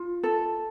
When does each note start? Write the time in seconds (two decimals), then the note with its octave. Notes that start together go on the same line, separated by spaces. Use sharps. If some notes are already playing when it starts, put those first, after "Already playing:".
Already playing: F4
0.23 A4